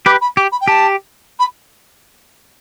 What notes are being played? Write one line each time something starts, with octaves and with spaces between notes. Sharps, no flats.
G4 B4 D6
B5
G4 D6
B5
G5
G4 A5
B5